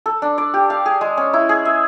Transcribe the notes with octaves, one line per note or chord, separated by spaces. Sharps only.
A4
D4
D5
G4
F5
G#4
G#3
C#4
E4
G#4
E5